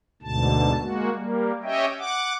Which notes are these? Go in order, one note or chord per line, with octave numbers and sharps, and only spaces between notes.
D2 G#2 B2 D3 A5
G#3 A#3 F#4
G3 A#3
C#4 G4 C#5 D#5 E5 G5
F#5 D6